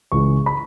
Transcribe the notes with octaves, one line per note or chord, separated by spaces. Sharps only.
C#2 C#3 E3 G#3 C#6
B5